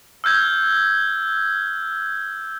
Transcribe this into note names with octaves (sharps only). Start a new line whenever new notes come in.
E6 F6 G6 G#6